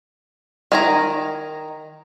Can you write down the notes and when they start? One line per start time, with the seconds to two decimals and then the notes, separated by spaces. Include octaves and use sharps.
0.72 D#3 G#5 A#5